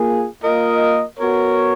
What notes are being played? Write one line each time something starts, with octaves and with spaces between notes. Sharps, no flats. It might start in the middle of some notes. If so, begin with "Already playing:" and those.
Already playing: A#3 F4 G#4
A#3 F4 A#4 D#5
B3 F#4 A#4 C#5